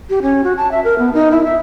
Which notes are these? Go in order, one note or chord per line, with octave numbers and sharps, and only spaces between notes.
G4
C#4
F#4
A5
E5
A#4
B3
D#4
E4
E5